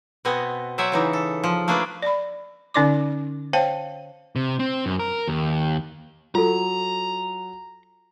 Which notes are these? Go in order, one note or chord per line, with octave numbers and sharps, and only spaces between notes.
B2 B3 C4 D#5 F#5 G#5
F#3 C5 D5 E5 F#5 G#5
C#3 E3 D#4
A4
F3
A3 A#3 D4 G#4 B4 D5
D5 B5
D3 C#4 D#4 D5 C6 D6
C5 C#5 F5 G5 A5
C3
C4
F#2
A#4
D#2
F#3 F4 A4 A#5